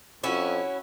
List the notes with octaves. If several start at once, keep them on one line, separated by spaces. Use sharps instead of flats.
F2 C#4 E4 F#4